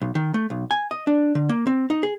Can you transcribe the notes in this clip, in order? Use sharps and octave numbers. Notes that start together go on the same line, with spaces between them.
B1
D#3
A3
B1
G#5
D#5
D4
D3
A#3
C4
D#4
G#4